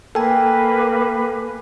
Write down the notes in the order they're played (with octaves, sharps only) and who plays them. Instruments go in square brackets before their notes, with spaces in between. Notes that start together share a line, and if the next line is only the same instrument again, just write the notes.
[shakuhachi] A#3 [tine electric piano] A4 G#5 [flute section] B4 [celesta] G5